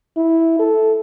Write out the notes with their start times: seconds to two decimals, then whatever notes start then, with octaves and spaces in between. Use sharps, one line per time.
0.17 E4
0.59 A4